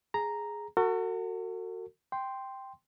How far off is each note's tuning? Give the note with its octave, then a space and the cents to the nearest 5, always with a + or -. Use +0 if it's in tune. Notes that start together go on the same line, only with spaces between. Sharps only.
G#4 +0 A#5 +0
F#4 +0 A4 +45
G5 +0 C6 +0